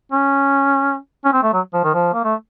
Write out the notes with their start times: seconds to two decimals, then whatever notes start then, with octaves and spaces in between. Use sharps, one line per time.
0.12 C#4
1.25 C#4
1.33 C4
1.43 A3
1.53 F#3
1.73 F3
1.84 D#3
1.94 F3
2.13 A#3
2.24 A3